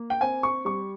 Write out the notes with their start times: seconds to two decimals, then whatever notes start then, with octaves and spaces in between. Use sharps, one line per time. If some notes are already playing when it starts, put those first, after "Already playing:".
Already playing: A#3
0.10 G5
0.21 C4 G#5
0.43 C#6
0.65 G3 C#6